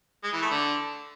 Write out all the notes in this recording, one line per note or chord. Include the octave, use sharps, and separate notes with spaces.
G#3
E3
A3
D3